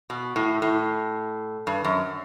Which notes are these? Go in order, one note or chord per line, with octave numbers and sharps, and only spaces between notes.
B2
A2
A2
G2
F#2